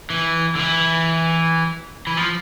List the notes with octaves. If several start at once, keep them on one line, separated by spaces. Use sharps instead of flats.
E3
D3
E3
E3
F3